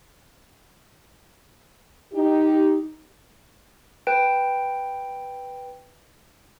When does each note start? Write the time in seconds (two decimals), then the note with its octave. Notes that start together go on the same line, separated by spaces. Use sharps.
2.14 D#4 G4
4.07 B4 G5 D7